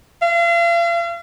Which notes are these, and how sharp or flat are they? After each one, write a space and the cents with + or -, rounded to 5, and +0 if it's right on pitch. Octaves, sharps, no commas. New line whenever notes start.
F5 -40